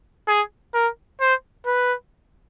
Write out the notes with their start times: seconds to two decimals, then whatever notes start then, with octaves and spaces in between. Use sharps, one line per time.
0.28 G#4
0.74 A#4
1.21 C5
1.66 B4